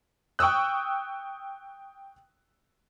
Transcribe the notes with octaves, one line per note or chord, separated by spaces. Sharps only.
G5 C#6 D#6 E6 F#6